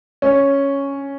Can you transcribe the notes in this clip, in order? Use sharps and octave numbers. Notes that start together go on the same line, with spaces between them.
C#4